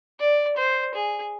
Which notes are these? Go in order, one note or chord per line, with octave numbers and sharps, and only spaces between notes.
D5
C5
G#4